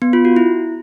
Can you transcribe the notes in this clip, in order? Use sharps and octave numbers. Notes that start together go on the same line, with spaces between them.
B3
F4
F#4
E4